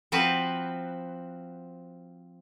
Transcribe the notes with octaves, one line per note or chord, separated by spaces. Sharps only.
F3 C4 F#4 B4